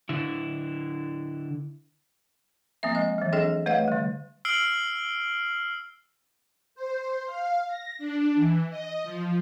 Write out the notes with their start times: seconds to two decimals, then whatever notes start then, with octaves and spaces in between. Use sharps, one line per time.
0.09 D3 E4
2.83 F3 A#3 C4 E5
2.95 G#3 D#5
3.18 E3 F#3
3.32 C4 D4 G#4 A4 D#5 G5
3.66 A3 B4 C#5 D#5 F5 F#5
3.88 D3 G3
4.45 E6 F6 C7 D7 F#7 G7
6.75 C5
7.27 F5
7.68 A#6
7.99 D4
8.36 E3
8.70 D#5
9.04 F3